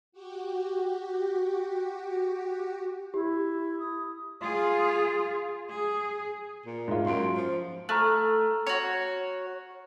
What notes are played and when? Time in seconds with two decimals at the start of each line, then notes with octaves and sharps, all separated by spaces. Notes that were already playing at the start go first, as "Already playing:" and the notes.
0.12 F#4 G4
3.14 E4 G4
3.80 D#6
4.41 F4 G#4
5.69 G#4
6.65 A#2
6.88 G#2 F4
7.06 F#2 C6 D7
7.37 F3
7.89 A3 A#5 F6 F#6
8.67 F#4 C#5